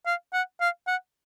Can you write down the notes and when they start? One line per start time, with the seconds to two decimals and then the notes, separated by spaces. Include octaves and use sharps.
0.06 F5
0.33 F#5
0.61 F5
0.87 F#5